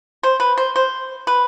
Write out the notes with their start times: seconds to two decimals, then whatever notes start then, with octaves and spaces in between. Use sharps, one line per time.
0.23 C5
0.40 B4
0.57 C5
0.76 C5
1.27 B4